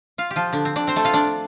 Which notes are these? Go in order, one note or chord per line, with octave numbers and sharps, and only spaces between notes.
F4 F5
G4
F3 F4
D3 D4
C4
D4 D5
C4 C5
A3 A4
F4 F5
D4 D5